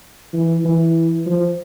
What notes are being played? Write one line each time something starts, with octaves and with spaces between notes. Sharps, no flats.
E3
E3
F3